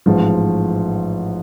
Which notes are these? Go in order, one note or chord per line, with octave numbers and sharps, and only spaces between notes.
A1 G#2 F3